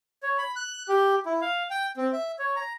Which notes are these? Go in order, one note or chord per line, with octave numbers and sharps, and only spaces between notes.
C#5
B5
F#6
G4
E4
F5
G5
C4
E5
C#5
A#5